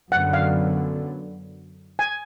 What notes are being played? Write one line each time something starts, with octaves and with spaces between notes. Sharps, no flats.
F#2 D3 F#3 B3 F#5
F5
G#5